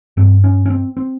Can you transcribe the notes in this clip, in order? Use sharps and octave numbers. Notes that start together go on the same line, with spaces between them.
G2 C4
C#4
C#4
C4
C4